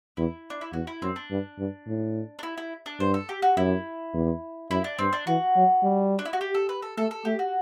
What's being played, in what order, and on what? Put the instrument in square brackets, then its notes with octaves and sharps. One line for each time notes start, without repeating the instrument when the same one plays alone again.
[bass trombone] E2 [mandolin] E4
[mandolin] D4
E4
[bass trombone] E2 [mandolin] F#4
[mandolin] E4
[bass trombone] F#2 [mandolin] C4
[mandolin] D4
[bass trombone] G2
G2
A2
[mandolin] D4
E4
E4
D4
[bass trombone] G2 [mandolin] C5
[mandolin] A4
G4
F#4
[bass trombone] F#2 [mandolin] E4
[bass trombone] E2
[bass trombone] F#2 [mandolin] E4
[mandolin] D4
[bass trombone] G2 [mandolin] C4
[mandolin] D4
[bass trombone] E3 [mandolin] F#4
[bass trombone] F#3
G3
[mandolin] D4
E4
F#4
G4
A4
B4
A4
[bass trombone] A3 [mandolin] A4
[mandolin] A4
[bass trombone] A3 [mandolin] G4
[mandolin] F#4